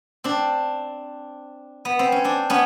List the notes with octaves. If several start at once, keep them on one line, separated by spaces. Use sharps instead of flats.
C4 D4
B3
C4
C#4
C4 D4
B3 C#4